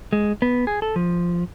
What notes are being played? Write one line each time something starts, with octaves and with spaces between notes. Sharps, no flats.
G#3
B3
G#4
A4
F3